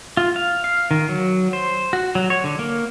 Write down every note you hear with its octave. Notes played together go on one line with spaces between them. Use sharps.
F4
F5
F5
D#3
F#3
C5
F#4
F#3
C#5
D3
A#3